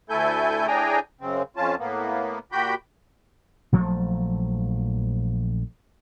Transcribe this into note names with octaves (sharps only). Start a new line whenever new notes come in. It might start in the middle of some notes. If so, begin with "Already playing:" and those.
D2 A3 E4 A4 G#5 G6
A2 D4 G#4 G5 G#5 A#5
F#2 C#3 C4
F2 C#4 F4 A5
A2 A#3 B3
A#2 F#4 G4 G5 B5 G6
A#1 F3 F#3 A3